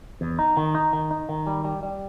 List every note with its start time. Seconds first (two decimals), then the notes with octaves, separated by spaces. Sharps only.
0.21 E2
0.39 D#4
0.57 D#3
0.75 D#4
0.93 D#3
1.11 D#4
1.29 D#3
1.47 G3
1.65 G3
1.83 G3